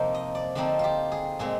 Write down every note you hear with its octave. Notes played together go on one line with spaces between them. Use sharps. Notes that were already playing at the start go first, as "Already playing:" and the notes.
Already playing: C3 F3 A#3 D#4 C5
D#5
D5
D3 F3 C4 D#4 D5
F4 G4
G#4
A#2 G#3 C4 G#4